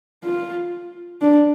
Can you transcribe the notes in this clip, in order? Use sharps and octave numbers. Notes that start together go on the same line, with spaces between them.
F4
D4